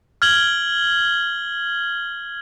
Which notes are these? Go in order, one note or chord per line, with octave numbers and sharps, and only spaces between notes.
F6 G#6 F#7 G7